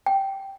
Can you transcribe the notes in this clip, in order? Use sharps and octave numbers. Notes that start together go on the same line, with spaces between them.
G5